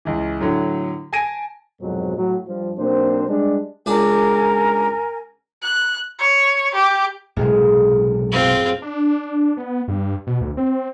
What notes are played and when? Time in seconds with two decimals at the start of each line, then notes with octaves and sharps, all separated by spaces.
0.05 C#2 E3
0.40 A2 D3 F#3
1.13 G#5 A5 G#6 A#6 D7 D#7
1.80 C2 F2 G#2 B2 F#3
2.17 A2 F#3
2.47 G2 F3
2.78 B1 A#3 C4 D4 C5
3.28 G3 G#3 D4
3.86 C#2 D4 A#4 G#5 A5
5.62 F#6
6.19 C#5
6.74 G4
7.36 B1 A2 C3 G#3 G#4 F6
8.32 F#1 F#3 C4 F4
8.82 D4
9.57 B3
9.88 G2
10.27 B2
10.41 D2
10.57 C4